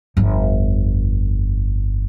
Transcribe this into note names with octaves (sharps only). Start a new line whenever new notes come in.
G1 F2